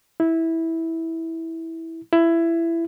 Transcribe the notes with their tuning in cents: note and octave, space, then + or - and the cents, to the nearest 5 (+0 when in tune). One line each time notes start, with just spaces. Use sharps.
E4 -15
E4 +15